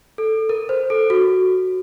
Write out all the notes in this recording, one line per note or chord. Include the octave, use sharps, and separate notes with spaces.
A4
A#4
C5
A4
F#4